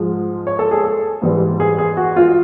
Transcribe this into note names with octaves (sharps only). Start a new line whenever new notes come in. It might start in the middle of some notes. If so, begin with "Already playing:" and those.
Already playing: G#2 F3 G#3
C#5
A4
G#4
A4
G#2 E3 G3
G#4
G#4
F#4
F4